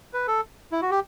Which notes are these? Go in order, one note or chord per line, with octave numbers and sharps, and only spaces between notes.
B4
A4
E4
F#4
G4